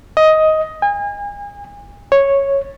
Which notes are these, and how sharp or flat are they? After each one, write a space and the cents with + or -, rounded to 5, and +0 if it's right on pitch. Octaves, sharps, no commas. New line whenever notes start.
D#5 +10
G#5 -35
C#5 -5